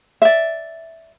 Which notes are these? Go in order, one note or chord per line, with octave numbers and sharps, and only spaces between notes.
D5 E5